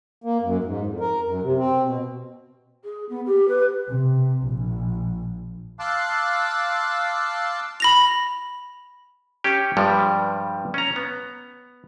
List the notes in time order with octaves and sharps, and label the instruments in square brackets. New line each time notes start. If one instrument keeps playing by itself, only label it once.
[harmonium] A#3
F#2
G#2
F2
A#4
F#2
C3
C4
B2
[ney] G#4
B3
G4
B4
[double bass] C3
A#1
[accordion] F5 A5 C6 D6 E6 F#6
[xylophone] B5 A#6 F7
[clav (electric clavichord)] C#4 G4
G2 F3 G3 G#3
C#4 A#5
B3